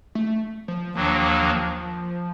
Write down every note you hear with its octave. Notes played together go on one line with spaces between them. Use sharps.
A3
F3
D#2 D#3 F3 F#3 A#3 D4